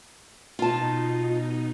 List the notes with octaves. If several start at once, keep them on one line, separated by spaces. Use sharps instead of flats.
B2 D#4 F4 A5